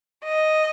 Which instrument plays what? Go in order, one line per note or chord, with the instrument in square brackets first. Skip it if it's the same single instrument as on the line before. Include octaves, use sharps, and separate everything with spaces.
[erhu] D#5